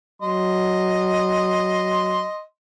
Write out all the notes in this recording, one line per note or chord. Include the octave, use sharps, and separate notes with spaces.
F#3 D#5 C6